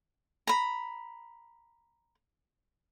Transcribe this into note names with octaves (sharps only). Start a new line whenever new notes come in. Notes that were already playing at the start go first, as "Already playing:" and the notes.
A#5 B5